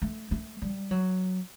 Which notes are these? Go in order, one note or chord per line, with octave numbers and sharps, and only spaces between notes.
A3
A3
G3
F#3